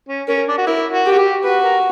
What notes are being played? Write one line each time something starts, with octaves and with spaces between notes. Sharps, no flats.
C#4
C#4 A#4
D4
F#4
E4 A#4
F#4
G4
F#4
G4
F#4 B4
A#4